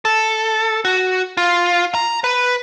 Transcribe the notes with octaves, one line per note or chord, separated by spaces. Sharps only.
A4
F#4
F4
A#5
B4